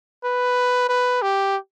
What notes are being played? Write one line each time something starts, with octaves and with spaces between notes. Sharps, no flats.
B4
B4
G4